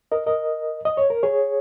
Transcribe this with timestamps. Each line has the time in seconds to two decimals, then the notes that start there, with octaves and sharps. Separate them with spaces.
0.12 A#4 D#5
0.27 A#4 D#5
0.85 D#5
0.97 C#5
1.10 A#4
1.23 G#4 C#5